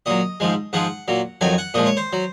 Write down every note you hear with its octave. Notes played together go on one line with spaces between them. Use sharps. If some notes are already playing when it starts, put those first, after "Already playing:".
A#2 F#3 D#5
G#2 F3 G#3
G#2 F3 G#3 F#5
A#2 F#3
F2 D#3 F#3 G#5
F#5
A#2 F3 G#3 D#5
C#5
C5
F#3